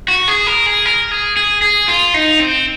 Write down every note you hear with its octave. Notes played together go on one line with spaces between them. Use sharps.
F#4
G#4
A#4
G#4
A#4
G#4
G#4
G#4
F4
D#4
C4